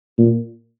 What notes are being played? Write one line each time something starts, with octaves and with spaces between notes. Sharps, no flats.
A#2